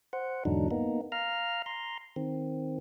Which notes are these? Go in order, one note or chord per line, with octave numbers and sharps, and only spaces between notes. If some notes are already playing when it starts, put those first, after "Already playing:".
C5 F#5
E2 G#2 D3 F#3 D4 D#4
A#3 B3 D#4
F5 A#5 F6
A#5 C6
D#3 C4